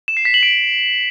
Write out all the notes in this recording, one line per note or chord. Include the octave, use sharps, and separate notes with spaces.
E7
C7
B6
F#7
D7